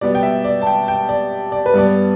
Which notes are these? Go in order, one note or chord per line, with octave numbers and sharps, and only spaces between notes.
B2 G3 B3 D5
G5
E5
D5
A5
G5
G5
D5
D5
B4
G2 G3 B3 D5